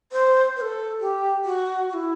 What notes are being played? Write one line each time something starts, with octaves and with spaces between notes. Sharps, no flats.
C5
B4
A4
G4
F#4
F#4
E4